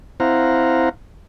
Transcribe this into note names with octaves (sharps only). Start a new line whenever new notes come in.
C4 E4 C5 F5 F#5 A#5